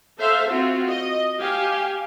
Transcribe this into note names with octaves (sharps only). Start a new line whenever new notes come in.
A4 C5 E5 F5
C4 F4 F#4
D#5
G4 F5 G#5